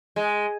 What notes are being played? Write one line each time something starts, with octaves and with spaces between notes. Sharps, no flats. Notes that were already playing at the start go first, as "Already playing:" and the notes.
G#3